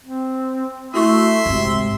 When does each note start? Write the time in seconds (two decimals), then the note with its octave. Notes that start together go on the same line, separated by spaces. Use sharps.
0.04 C4
0.94 A3 E4 F#4 E5 C6 C#6
1.46 G#1 G#2 C3